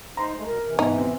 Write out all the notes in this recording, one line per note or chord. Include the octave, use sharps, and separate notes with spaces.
D#4 C5 A#5 C6
G#3 A3
B2 A#4
C3 E3
G#2 B3 D#4
C4